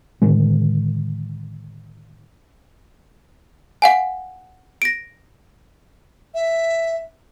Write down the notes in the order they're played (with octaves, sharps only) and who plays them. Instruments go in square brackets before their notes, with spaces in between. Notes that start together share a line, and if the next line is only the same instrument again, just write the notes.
[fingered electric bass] A2 D3 D#3 G#3
[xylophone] F5 F#5 G#5
A#6 D7
[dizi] E5